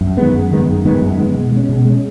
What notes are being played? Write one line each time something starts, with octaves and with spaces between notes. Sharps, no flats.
F#2
D#3 G#3 B3
F#2
D#3 G#3 B3
F#2
D#3 G#3 B3
F#2
D#3 G#3 B3
B2
G#3
C#4
B2
G#3 C#4